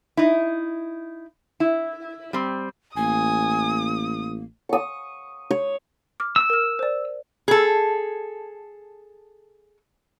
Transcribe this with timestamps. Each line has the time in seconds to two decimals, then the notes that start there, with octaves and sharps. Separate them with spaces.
0.17 D#4 E4
1.60 E4
2.33 G3 C4
2.97 A1 A#3 G#5 D#6
4.69 C#6 D#6
5.51 C#5
6.20 D6 F6
6.36 E6
6.50 A#4 F6
6.79 C5 D5
7.48 G#4 A4